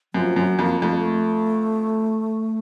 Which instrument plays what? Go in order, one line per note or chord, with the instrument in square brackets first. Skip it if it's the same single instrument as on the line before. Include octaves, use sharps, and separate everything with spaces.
[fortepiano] F#2 [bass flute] F3
[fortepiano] F#2 [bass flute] F#3
[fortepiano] F2 [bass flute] A#3
[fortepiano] F2 [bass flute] A3
[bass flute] G#3
A3